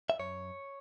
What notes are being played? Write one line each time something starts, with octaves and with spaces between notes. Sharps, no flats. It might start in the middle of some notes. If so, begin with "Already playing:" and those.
E5
F#2 C#5